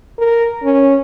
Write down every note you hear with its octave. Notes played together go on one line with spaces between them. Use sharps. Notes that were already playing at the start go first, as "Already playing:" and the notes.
A#4
C#4